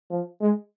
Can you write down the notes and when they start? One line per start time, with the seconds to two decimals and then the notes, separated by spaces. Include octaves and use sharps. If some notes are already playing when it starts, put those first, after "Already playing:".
0.10 F3
0.41 G#3